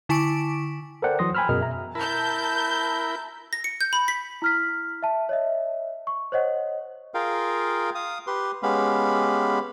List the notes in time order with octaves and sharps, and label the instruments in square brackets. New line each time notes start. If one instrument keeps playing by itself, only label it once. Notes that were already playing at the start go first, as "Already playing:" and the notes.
[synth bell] D3 E4 G#5 C#6 B6 D7
[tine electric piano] A4 A#4 C5 D5 F#5 G5
E3 F#3 C6 D#6 A#6
G5 G#5 A#5 B5 E6 F6
F#2 B2 G#4 A#4 D#5 F6
E5 A#5
[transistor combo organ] E4 A#4 B5 [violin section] A5 G6
[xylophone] A#6
C#7
G6
B5
B6
[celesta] E4 F6 B6
E5 A5
C#5 D#5 E5
C#6
C5 C#5 D#5 F#5
[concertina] F4 G#4 A#4 F5 G5
F5 D#6
G4 B4 C6
G#3 B3 C#4 G4 F5 B5